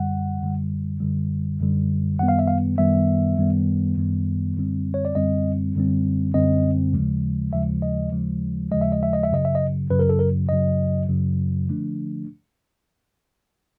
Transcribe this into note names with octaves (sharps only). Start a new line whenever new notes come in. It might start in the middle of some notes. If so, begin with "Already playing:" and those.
Already playing: F#2 D3 G3 F#5
F#2 D3 G3
F#2 D3 G3
F#2 D3 G3
F#2 D#3 G3 B3 F#5
F5
E5
F5
F#2 D#3 G3 B3 E5
F#2 D#3 G3 B3
F#2 D#3 G3 B3
F#2 D3 G3 C4
C#5
D5
F#2 D3 G3 C4 D#5
F#2 D3 G3 C4
F#2 D3 G3 C4 D#5
D#2 C#3 F3 G#3
D#2 C#3 F3 G#3 E5
D#5
D#2 C#3 F3 G#3
D#2 C#3 F3 G#3 D#5
E5
D#5
E5
D#5
E5
F#2 C#3 F#3 D#5
E5
D#5
F#2 C#3 F#3 B4
A#4
A4
A#4
F#2 C#3 F#3 D#5
F#2 C#3 F#3
D3 F3 A3 D4